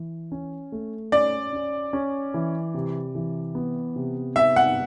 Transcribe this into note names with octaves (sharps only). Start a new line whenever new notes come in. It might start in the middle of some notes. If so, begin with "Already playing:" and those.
Already playing: E3
C#4
A3
C#4 D5
C#4
C#4
E3
C3
E3
B3
C3
B3 E5
F#5